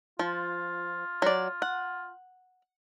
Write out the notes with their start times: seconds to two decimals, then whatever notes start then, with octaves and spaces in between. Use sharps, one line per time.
0.19 F3 F4
1.22 F#3 D5
1.62 F#5